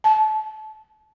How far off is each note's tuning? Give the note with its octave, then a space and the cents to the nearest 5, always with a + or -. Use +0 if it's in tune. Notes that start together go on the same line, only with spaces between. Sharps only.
A5 -25